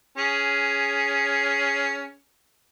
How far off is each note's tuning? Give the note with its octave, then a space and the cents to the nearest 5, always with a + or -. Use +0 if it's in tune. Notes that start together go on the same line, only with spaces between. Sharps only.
C#4 +10 G#4 +0